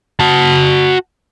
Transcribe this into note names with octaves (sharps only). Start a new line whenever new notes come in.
F#4 A5